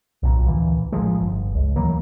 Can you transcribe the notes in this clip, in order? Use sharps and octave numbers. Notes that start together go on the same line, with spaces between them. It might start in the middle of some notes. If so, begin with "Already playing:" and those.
B1 A#2
D2 A#2 E3
A1 F3 G#3
G1
C#2
D#2 E3 F#3 A#3